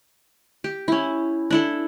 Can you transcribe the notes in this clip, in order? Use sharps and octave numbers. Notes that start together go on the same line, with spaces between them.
G4
C#4 E4
D4 E4 A4